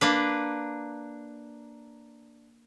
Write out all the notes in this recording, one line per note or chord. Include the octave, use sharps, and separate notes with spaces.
A#3 D4 B4